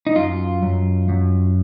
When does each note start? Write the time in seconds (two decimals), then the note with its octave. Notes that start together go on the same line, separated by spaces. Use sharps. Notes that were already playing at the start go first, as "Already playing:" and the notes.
0.07 D#4
0.16 F#2 F4
0.62 F#2
1.09 F#2